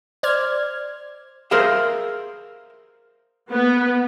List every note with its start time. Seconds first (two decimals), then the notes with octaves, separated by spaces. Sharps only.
0.23 C5 D5 F6 G#6
1.51 G#4 A#4 C5 E5 F5
3.50 B3